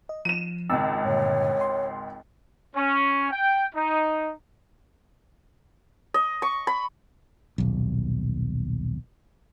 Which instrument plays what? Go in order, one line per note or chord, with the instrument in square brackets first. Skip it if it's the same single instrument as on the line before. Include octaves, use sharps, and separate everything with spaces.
[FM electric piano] D#5
[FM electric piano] F3 [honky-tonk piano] D#7 E7
[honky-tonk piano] G#1 C#2 [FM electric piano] E6
[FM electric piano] G2 A#2 D3 [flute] C#5
[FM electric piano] C6
[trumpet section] C#4
G5
D#4
[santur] D#5
C#6
B5
[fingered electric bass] D#1 B1